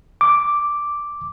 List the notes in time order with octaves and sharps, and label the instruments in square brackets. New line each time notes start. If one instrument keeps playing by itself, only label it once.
[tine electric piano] D6